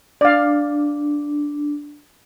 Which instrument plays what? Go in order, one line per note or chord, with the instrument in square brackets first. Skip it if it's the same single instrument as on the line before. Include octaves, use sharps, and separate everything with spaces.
[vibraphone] D4 [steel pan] D5 F5